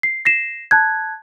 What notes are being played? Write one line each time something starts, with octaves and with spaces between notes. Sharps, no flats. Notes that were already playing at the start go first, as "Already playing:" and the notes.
C7
A#6 C7 E7
A5 F#6 G#6